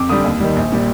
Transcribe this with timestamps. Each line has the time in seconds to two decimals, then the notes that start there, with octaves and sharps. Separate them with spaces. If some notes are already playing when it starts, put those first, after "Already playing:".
Already playing: F2 D6
0.09 D3 G3 D#6
0.24 D#2
0.40 D#3 G3
0.56 A#1
0.72 A#2 G3